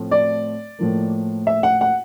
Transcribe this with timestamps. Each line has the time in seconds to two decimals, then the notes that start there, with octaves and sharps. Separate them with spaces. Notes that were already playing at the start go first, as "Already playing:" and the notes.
Already playing: A2 F3 A3 C4
0.11 D5
0.79 A2 F3 A#3
1.47 E5
1.63 F#5
1.81 F#5